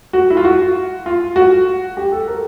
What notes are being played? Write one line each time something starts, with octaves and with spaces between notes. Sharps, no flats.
F#4
E4
F4
F#4
F4
F#4
G4
A4
A#4